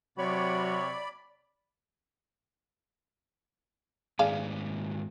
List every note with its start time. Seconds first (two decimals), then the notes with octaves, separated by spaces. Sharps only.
0.18 C3 F#3 F#4 C#5 D5 B5
4.19 G#2 D#3 B3 G#4 D5 F5